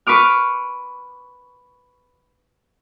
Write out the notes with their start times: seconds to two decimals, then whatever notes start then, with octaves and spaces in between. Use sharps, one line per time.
0.07 B4 C#6 D6 F6